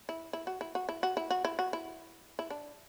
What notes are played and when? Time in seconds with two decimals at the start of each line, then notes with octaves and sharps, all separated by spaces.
0.09 E4
0.33 E4
0.47 F#4
0.61 E4
0.75 F#4
0.89 E4
1.03 F#4
1.17 E4
1.30 F#4
1.45 E4
1.59 F#4
1.73 E4
2.39 E4
2.50 D4